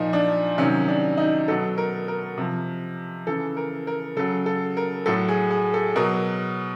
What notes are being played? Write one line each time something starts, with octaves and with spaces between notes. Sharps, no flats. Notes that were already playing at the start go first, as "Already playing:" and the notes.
Already playing: A#2 F3 D#4
D4
C3 D#3 F#3 C#4
D4
D#4
B2 F#3 A4
A#4
A#4
C3 F3
C#3 E3 A4
A#4
A#4
C#3 F#3 A4
A4
A#4
A2 F#3 A4
G#4
G#4
A4
B2 F#3 A#4